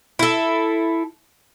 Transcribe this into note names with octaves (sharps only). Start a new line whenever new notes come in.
E4 A4